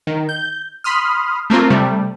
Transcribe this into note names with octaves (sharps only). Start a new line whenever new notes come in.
D#3
G6
B5 C6 D#6 F6
A3 A#3 C4 F4
C3 G3 A3